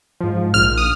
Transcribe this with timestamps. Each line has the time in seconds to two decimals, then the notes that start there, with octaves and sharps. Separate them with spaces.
0.21 G#2 F3
0.54 A#1 F6
0.78 D#6